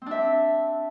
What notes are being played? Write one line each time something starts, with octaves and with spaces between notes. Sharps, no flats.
C4 D4 E5